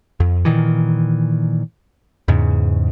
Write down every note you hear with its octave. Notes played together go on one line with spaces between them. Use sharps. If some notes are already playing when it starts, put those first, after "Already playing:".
F2
A#2 D#3 E3
E2 G#2 C#3